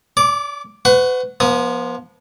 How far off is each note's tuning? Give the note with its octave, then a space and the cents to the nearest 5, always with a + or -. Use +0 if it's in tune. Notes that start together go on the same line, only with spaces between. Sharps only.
D5 -40 D6 +0
B4 +40 F#5 +0 C#6 +0
F3 +0 B3 -40 D#6 +0